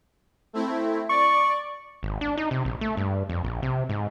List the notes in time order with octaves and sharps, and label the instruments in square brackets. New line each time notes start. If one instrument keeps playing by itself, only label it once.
[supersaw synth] A3 C4 E4
[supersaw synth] D5 [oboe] C#6
[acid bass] G#1
D4
D#4
C3
A#1
A3
G2
F2
A#1
C3
G#2